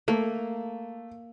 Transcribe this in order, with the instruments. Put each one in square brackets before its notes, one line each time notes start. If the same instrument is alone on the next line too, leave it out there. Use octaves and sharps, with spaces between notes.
[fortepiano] A3 [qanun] A#3